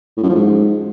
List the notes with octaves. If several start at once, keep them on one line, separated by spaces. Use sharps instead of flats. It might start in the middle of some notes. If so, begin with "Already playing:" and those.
A2
F#2
F3
G#2